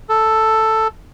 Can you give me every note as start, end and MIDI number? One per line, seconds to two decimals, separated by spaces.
0.09 0.88 69